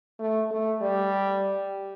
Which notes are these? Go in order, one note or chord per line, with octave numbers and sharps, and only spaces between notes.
A3
A3
G3